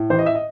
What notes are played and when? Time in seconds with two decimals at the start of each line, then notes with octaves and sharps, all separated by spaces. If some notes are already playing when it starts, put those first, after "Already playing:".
Already playing: A2
0.10 A1 C5
0.19 D#5
0.26 E5
0.35 D#5